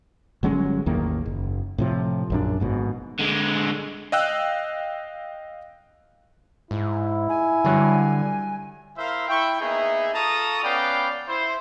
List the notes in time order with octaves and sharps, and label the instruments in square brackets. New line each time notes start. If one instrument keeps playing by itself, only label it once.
[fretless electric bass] G1 F#3 G#3 C#4
A1 E2 D#3 A#3
F#1
A2 C3 F3
A#1 F#2 D4
G#1 G#2 B2
[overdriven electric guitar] D3 G#3
[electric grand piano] D#5 F5 G5 E6 F#6
[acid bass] G#2 [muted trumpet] E4
[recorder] G#5
[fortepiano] G2 F#3 [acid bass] D3
[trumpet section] E4 A#4 C5 E5 F5
E4 G5 C#6
A#3 B3 D#4 G#4 E5
F4 A4 A5 A#5 C#6 D#6
B3 C#4 B4 D5 F5 G5
E4 C5